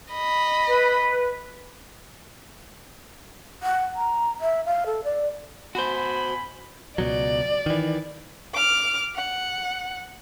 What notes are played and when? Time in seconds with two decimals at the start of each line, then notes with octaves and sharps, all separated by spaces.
0.12 D#5 B5
0.67 B4
3.63 F#5
3.96 A#5
4.41 E5
4.66 F5
4.86 A4
5.04 D5
5.75 B2 F#4 C5 G#5 B5
6.98 C#2 B2 F#3 D5
7.66 D#3 E3
8.54 D6 F6
9.16 F#5